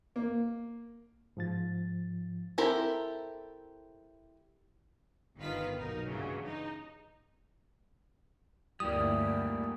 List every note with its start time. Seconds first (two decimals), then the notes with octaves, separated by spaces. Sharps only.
0.16 A#3
1.37 G#2 F3 A6
2.58 C4 E4 G4 A4 A#4
5.37 G1 D#3 F4 B4 F5 B6
5.76 B1 D#4 A#4
6.09 G2 C#3 E3 F#3
6.44 D#4
8.80 D2 G2 G3 A#3 E4 D5 G5 D#6